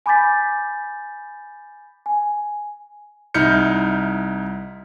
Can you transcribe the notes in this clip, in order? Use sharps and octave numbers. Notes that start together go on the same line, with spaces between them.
G#5 B5 D6 G6 A6 B6
G#5
C2 D#4 E4 F6 G6 C#7